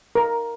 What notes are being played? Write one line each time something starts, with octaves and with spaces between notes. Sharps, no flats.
A#4